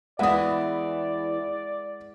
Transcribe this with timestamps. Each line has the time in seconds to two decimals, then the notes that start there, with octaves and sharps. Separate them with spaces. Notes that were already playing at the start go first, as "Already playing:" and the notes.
0.19 E2 E3 G#3 E4 B4 D5 F#5 D#6